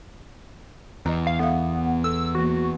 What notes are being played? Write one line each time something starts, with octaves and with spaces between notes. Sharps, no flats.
E2 D#5 A#5
F5
B3 A4 E5 F5
A4 E6
E3 A#3 F#4